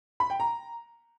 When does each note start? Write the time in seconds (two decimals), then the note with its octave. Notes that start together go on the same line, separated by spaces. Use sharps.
0.20 B5
0.30 G5
0.40 A#5